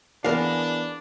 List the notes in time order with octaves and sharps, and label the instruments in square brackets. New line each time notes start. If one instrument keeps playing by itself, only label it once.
[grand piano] E3 B3 G#4 [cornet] D4 [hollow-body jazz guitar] A#4 F5